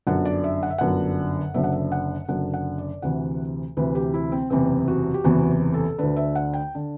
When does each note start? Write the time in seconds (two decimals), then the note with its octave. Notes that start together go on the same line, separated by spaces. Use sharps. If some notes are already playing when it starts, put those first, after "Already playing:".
0.07 G1 F#2 D3 F#5
0.25 D5
0.44 E5
0.63 F#5
0.70 E5
0.78 G1 F#2 D3 F#5
1.54 F#1 F#2 D3 E5
1.64 F#5
1.72 E5
1.92 F#5
2.28 F#1 F#2 D3 F#5
2.54 F#5
2.78 D5
3.02 D2 C3 E3 F#5
3.77 D2 C3 E3 B4
3.95 G4
4.14 E4
4.32 C4
4.50 F#1 E2 C3 E3 C4
4.88 F#4
5.14 G4
5.24 F#1 E2 C3 E3 F#4
5.74 A4
5.99 D2 D3 B4
6.17 E5
6.35 F#5
6.54 G5
6.75 D3